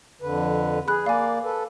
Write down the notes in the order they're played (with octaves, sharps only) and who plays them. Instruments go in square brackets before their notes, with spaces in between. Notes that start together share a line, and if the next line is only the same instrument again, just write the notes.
[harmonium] F2 D3 B4
[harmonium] G#4 [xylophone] B5 F#6
[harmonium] A#3 D5 [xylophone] F5 G#5
[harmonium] A4 B4